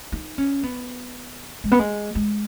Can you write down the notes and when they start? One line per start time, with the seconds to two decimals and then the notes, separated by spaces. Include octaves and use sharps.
0.12 D#4
0.38 C#4
0.63 B3
1.64 G#3
1.72 B3
1.79 G#3
2.15 G#3